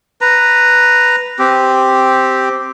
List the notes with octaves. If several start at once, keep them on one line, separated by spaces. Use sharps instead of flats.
B4 A#5
C4 G4